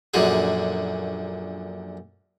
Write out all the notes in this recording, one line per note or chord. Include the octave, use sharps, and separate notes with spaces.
A#1 F#2 D3 F#4 G#4